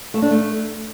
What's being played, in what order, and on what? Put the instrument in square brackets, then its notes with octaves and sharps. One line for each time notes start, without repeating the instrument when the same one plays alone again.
[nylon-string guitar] A3
D4
A3